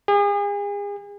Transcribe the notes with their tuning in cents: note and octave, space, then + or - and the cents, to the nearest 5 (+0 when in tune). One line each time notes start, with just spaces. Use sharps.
G#4 -35